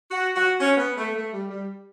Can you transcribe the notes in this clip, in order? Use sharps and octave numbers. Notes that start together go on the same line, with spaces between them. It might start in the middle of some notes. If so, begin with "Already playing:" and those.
F#4
F#4
C#4
B3
A3
A3
G3
G3